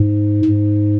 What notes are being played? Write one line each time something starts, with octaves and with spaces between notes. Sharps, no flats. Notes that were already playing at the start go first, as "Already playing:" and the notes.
Already playing: G#2
G#2